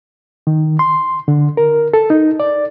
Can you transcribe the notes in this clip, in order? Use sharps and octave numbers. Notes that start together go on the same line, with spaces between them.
D#3
C6
D3
A#4
A4
D#4
D5